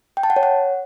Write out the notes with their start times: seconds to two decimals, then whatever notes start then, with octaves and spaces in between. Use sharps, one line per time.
0.17 G5
0.23 A5
0.30 F#5
0.36 C#5
0.43 F#5